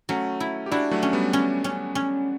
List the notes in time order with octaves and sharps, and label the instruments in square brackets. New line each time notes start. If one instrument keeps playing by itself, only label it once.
[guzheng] F#3 [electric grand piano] A3 C#4
[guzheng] E4
[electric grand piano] G4
[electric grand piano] D4 F#4 [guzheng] E4
[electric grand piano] F#3 A3
[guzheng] C#4
[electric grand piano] G3 B3
[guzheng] C#4
C#4
C#4